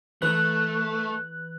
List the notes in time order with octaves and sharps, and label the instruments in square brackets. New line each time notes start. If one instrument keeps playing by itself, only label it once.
[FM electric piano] E3 B4 F#6 [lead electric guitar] A3